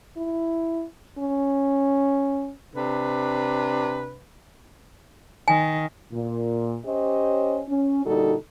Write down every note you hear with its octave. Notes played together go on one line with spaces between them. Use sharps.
E4
C#4
C3 D4 B4
D#3 G#5
A#2
C#4 G4 C5 C#5 D#5
C#4
A#2 D3 G3 D#4 F#4 A4